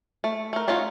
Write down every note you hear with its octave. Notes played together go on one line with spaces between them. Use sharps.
A3
A3 A#4
A3 C#4 D#4 F4 F#4